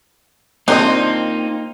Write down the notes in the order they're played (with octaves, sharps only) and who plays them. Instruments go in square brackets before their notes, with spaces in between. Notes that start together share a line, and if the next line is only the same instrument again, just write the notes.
[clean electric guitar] A#3 D#4 F4 [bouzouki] C4 [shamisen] D4 A#4 D#5